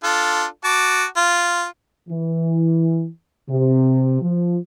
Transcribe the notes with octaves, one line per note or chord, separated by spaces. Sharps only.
D4 F4 A4
F#4 A5 D6
F4
E3
C3
F3